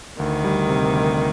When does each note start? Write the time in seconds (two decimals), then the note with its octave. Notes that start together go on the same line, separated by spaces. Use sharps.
0.20 D2 D#3
0.44 G3
0.69 C3
0.93 D2